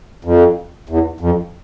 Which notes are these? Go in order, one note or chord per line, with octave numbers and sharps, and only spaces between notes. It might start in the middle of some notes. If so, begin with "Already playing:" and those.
F2
E2
F2